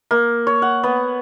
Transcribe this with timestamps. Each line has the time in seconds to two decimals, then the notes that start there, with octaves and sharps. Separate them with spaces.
0.11 A#3
0.47 C#5
0.62 F#5
0.84 B3